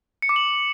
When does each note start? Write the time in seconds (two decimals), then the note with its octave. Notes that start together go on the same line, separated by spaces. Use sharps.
0.22 C#7
0.29 D6
0.36 F#7